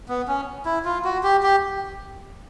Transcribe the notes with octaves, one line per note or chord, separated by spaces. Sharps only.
B3
C#4
E4
F4
F#4
G4
G4